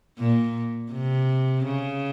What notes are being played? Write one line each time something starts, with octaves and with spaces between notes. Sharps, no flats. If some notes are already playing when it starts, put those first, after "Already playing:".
A#2
C3
C#3